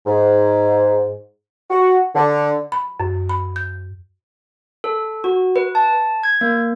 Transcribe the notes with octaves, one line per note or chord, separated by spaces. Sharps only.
G#2
F#4
D3
B5
F#2
B5
G6
A4
F#4
B4
A5
G#6
A#3